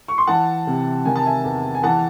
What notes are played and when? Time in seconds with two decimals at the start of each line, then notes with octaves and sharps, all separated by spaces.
0.08 C#6
0.18 C6
0.27 E3 F#5 A5
0.67 C3
1.05 D#3 G#5
1.16 A5
1.26 E5 G#5
1.44 E2
1.75 G#5
1.83 E3 F#5 A5